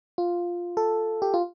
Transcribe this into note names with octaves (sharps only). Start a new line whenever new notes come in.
F4
A4
G4
F4